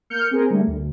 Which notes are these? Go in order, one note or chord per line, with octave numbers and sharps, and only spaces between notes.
A#3 F6 G6 C#7
C4 G#4 A#4
D3 G3 A3
D2